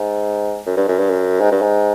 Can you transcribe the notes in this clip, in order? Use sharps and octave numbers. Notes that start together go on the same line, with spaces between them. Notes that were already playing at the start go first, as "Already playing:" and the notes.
Already playing: G#2
F#2
G2
F#2
G2
F#2
G#2
G2
G#2